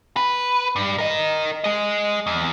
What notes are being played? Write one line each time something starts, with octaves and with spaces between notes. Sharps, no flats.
B4
G2
A#4 D#5
G#4 D#5
E2